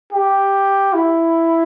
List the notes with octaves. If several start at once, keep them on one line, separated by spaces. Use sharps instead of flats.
G4
E4